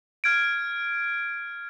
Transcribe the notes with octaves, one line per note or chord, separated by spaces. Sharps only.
F6 G#6 D7